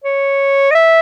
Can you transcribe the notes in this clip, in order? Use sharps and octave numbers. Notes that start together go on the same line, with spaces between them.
C#5
D#5
E5